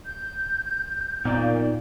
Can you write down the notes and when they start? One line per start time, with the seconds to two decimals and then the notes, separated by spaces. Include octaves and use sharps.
0.06 G6
1.25 A#2 B3 D#4 D5